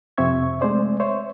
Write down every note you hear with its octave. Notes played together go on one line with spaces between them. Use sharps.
F2 C3 C4 E5 C#6 G#6
G#3 A3 C4 C5 D5
C5 C#5 E5